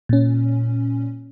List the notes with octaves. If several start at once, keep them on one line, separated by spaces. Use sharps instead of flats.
A#2 C#4